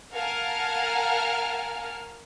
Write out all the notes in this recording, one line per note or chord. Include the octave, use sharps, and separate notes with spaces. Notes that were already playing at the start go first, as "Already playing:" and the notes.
A#4 F5 F#5 G#5 A5 F6